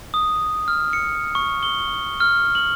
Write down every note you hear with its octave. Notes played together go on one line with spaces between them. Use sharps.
D#6
F6
C#7
C#6
G7
F6
F#7